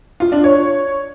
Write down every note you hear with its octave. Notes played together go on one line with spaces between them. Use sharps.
F4
D4
C#5